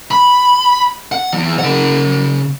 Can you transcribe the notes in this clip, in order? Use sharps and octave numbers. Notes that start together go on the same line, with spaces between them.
B5
F#5
E2
C#3 F#5